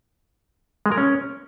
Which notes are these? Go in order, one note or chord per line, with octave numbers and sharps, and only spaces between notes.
G#3
A#4
C#4